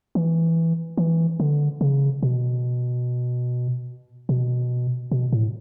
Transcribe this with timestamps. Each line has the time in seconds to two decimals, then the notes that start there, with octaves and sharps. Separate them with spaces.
0.15 E3
0.97 E3
1.40 D3
1.81 C#3
2.23 B2
4.29 B2
5.12 B2
5.33 A2